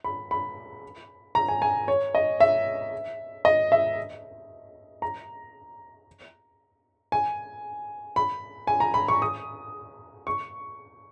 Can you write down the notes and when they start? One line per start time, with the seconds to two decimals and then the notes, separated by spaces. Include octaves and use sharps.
0.04 B5
0.31 B5
1.35 A#5
1.48 G#5
1.62 G#5
1.88 C#5
2.15 D#5
2.40 E5
3.45 D#5
3.72 E5
5.02 A#5
7.12 G#5
8.16 B5
8.67 G#5
8.80 A#5
8.94 B5
9.08 C#6
9.22 D#6
10.27 C#6